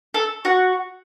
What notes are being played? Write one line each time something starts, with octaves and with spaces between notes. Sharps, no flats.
A4
F#4